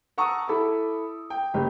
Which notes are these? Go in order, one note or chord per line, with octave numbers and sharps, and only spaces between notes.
F#5 A5 A#5 C#6 D#6 E6
E4 A4 B5 D6
G5
F#1 G4